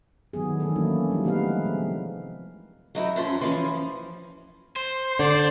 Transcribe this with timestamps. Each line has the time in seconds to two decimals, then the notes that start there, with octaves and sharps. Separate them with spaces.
0.33 D#3 F#3 B3 G#4
0.60 D#3 E3 A3 D4 G#4 A4
0.76 F#3 A#3 C#4 E4
1.10 F3 G3 D#4
1.24 F3 G#3 A3 B3 B4 F5
1.65 C3 C4
2.95 F#3 D#4 E4
3.16 F#2 F3 C#4
3.41 E3 F3 C#4
4.76 C5
5.19 D3 D5